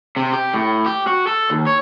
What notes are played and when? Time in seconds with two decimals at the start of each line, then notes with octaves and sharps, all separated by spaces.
0.16 C3
0.33 G4
0.54 A2
0.86 G4
1.07 F#4
1.27 A4
1.50 D#2
1.67 C#5